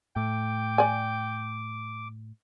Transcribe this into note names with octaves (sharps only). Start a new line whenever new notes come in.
A2 G5 D6
D5 G#5